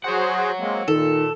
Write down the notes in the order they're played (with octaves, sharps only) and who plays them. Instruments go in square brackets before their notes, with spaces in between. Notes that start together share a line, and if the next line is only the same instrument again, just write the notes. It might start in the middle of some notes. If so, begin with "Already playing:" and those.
[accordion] F#4 G#4 C5 [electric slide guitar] C#5 F#5
[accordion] G#3 A#3 C4
[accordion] A#2 [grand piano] D#3 [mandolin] A4